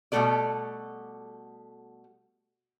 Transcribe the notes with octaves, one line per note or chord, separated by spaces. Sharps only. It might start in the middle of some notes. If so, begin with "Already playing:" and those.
B2 G3 A3 F#4 A4 D5